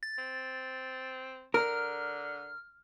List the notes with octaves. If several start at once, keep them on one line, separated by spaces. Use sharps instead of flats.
A6
C4
D3 A#4 F6